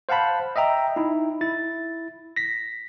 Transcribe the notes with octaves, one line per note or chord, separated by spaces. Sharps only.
C5 F5 F#5 A5 B5
D#5 E5 G5 A#5
D#4 E4
E4 A6
A#6 B6